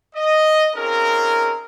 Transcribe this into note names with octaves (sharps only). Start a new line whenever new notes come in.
D#5
C4 C#4 D#4 F4 G#4 A#4